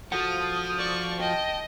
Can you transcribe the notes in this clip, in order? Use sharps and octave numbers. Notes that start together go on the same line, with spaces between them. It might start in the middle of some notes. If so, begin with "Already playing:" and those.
F3 F#4 A4 F#5 D#6
D5 C#6
D#5 G5 A5